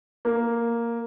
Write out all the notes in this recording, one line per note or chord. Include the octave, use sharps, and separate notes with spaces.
A#3